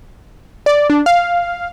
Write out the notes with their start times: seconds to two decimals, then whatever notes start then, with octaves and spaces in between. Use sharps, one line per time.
0.66 D5
0.90 D4
1.06 F5